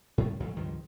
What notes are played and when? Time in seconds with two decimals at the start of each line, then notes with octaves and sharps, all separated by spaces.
0.18 G#2 C#3 G3 A3
0.40 F2 A2 D3 F#3
0.56 C#2 G2 D#3 F3